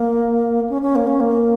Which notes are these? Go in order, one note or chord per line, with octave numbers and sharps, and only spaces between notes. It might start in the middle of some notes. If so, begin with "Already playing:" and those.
Already playing: A#3
C#4
C#4
A#3
C#4
A#3